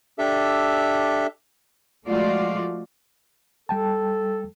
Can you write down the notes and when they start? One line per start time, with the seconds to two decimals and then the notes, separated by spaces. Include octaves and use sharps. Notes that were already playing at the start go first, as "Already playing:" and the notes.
0.19 D4 G4 A4 E5
2.06 F3 G#3 A3 F4 F#4 D5
3.69 G3 A4 G5 A5